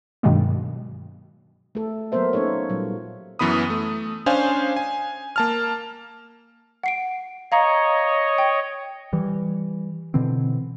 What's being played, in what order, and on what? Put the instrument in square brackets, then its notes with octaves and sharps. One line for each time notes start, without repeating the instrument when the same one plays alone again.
[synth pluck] G2 B2 D#3 F#3 G#3 A#3
[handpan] A3 A4
F#3 A#3 B3 A#4 C5 E5
A#3 C#4 D#4 A4 C#5
A#2 F#3 G3
[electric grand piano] F#2 E3 B3 B5 D#6
A3
C#4 D4 C5 F5 G#5
G#5
A#3 A5 F6
[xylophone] F#5 C7 D7
[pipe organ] C#5 D#5 [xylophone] F5 A#5 C#7
[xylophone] G5
[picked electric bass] E3 G3
B2 D3 E3 C4